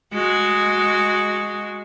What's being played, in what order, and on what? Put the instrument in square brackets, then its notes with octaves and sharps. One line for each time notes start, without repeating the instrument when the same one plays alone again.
[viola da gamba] G#3 F#4